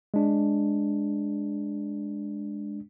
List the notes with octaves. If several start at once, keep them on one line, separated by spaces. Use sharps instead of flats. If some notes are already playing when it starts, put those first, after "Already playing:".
G#3 D4